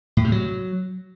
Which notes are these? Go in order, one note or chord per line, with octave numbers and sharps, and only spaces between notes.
A2
C3
F#3